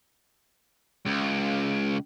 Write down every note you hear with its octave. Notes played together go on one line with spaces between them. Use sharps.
C#2